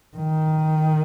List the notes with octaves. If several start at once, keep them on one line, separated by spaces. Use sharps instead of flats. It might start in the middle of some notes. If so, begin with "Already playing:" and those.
D#3